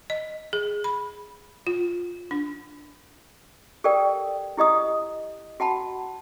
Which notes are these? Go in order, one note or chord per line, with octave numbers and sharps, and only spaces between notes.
D#5
G#4
B5
F4
D4
G4 A4 A#4 D5 G5
E4 G4 D#5 D#6
F#4 F#5 A5 B5